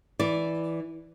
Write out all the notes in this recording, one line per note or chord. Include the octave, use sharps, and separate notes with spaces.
E3 D5